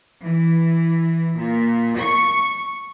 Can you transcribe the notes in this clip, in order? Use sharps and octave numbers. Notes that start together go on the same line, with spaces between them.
E3
A#2
C#6